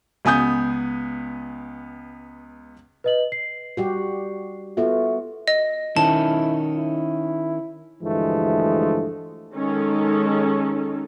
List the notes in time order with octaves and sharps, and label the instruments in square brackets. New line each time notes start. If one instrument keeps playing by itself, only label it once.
[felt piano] C#2 B3 G#5 D#6 G6
[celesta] B4 D#5 F#7
C7
[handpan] G3 F#4 G4
[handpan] B3 F4 F#4 [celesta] A4 E5
[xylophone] D#5
[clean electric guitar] D#3 C#4 [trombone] E4 [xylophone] A5
[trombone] E4
[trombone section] D2 G2 E3 F3 G#3 A3
[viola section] D#3 G#3 C#4 D#4 A4